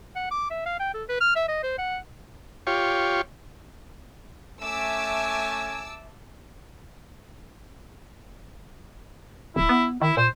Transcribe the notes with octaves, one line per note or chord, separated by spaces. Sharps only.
F#5
D6
E5
F5
G5
A4
B4
F6
E5
D#5
C5
F#5
F4 G4 C#5
A3 C#4 E5 G#5 A5 D6 E6
D1 E4
B3
D#3 E4
A#2 C5